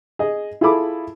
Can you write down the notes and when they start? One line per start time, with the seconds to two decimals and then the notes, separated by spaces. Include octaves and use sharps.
0.19 G#4 D#5
0.61 E4 F4 G#4 A4 B5 D6